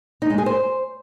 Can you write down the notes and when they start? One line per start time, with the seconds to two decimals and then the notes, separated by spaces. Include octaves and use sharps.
0.22 D#4
0.30 G#3
0.38 G#4
0.46 C5